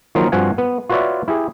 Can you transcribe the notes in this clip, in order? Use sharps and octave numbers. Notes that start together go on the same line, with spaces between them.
D#3 F3 F#3 A#3 D#4 F4
G2 F3 C4 F#4 F#5 G#5
B3
F4 F#4 B4 C#5 D5 E5
E4 G4 G#4